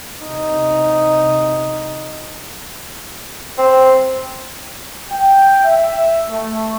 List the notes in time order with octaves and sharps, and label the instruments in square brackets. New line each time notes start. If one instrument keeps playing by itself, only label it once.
[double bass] C3 D#4
[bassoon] C4
[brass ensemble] G5
E5
A3